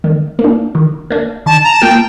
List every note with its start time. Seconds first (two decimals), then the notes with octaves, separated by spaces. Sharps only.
0.04 D#3
0.39 A#3
0.44 D4
0.75 D#3
1.10 A#3 D4
1.46 D#3 A5
1.64 A#5
1.73 A5
1.82 A#3 F4 G5